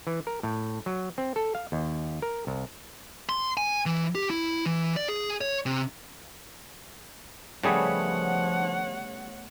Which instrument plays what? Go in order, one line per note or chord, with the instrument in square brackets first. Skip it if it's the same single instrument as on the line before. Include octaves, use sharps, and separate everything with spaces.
[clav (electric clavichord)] E3
A#4
A2
F#3
C4
A4
F5
D#2
A#4
C2
[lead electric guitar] C6
G#5
E3
G4
E4
E3
D5
G#4
C#5
C3
[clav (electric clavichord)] C#3 G3 G#4 [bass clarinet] F3 [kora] A3 B3 [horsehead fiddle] C#5 F#5